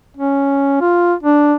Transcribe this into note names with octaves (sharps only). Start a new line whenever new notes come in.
C#4
F4
D4